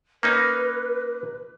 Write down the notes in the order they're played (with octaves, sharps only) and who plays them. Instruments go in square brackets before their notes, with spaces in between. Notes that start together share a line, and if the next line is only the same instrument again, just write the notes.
[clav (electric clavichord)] A#3 C#4 D#4 [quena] B4